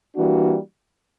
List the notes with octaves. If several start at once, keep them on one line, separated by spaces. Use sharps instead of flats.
E3 G3 A#3 D4 F#4